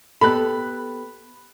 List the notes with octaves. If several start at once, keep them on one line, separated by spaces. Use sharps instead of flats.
B3 G4 A4 B5 F#6